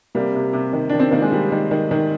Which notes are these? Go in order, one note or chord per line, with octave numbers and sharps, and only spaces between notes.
C3 G3 A#3
C3
C3
D#3
D#3 D4
C4
D#3 A#3
G#3
D#3 G3
D#3
D#3
D#3